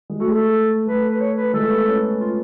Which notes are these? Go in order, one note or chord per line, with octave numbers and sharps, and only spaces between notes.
G#3
A3 F#4
G#4
A4
A3 B4
B4
C#5
B4
G#3 A4
A3
B3
C#4
F4